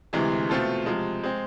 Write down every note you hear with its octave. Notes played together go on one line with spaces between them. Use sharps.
D2 C3 E3 G#3
B2 A3 C4 F4 A4
C3 F3 G#3
G#3 C4